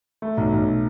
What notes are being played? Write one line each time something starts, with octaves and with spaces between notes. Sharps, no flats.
A3
B1
B1